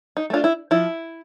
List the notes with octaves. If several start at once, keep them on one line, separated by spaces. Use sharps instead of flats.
D#4
A3 D4 F4
E4
F3 E4